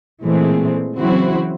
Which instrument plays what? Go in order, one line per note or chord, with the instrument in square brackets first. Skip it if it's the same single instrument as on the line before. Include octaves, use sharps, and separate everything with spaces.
[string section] A#2 E3 G#3 A3 C4
C#3 E3 F#3 C4 E4 F#4